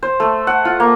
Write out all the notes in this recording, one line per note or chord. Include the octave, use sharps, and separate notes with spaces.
C5
A3
F#5
F4
A#3